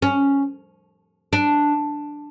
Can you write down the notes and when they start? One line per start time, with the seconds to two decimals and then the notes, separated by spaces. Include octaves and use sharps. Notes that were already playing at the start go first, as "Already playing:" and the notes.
0.02 C#4
1.33 D4